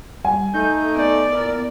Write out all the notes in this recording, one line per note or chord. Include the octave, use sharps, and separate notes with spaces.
G3 G#5
A3 D#4 G6
B3 D5
A#2 E4 A#4